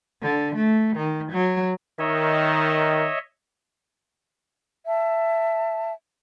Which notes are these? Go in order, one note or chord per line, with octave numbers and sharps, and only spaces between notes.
D3
A3
D#3
F#3
D#3 C#5 D#5 E5
E5 A5